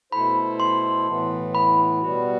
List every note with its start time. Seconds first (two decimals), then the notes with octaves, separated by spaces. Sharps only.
0.12 B2 A3 E4 A4 C5 B5
0.60 C6
1.07 A2 E3 B3
1.55 B5
2.01 B2 G3 B3 F#4